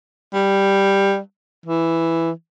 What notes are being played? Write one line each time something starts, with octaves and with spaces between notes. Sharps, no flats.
G3
E3